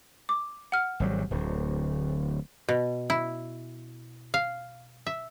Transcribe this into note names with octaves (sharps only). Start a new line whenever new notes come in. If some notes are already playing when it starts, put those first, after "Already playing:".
D6
F#5 F6
G#1 F#3 G3
D1 D2
B2
E4
F5
E5